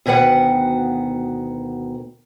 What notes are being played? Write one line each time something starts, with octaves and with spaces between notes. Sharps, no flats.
D2 B2 D#3 B4 F#5